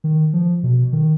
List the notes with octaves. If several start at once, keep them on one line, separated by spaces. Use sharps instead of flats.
D#3
F3
B2
D#3